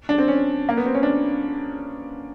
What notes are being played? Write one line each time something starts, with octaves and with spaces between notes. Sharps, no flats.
D4
C4
C#4
A#3
B3
C4
C#4
D4